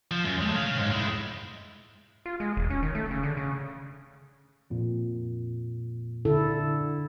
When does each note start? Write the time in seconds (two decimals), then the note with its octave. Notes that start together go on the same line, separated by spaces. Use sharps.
0.11 F3
0.25 F#2
0.41 G#3 A3
0.56 C#5 F5
0.78 G#2 D#4
0.92 G#3 E4
2.26 F4
2.40 G#3
2.57 E1
2.70 C#4
2.83 D#3
2.95 A3
3.10 C#3
3.23 D3
3.37 C#3
4.70 F2 A#2
6.25 D3 E4 A4